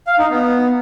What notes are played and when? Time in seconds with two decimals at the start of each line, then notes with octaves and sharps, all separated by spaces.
0.07 F5
0.19 D#4
0.30 B3